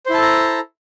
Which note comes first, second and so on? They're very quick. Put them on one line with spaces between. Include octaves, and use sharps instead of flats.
C5 E4 A5 A4 A#5